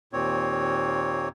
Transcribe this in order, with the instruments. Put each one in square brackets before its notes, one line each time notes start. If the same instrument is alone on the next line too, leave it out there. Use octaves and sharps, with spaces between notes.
[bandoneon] D#2 A#2 C4 C#5